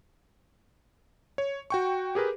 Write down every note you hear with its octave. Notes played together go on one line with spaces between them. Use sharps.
C#5
F#4 G5 C#6
G4 G#4 A#4 B4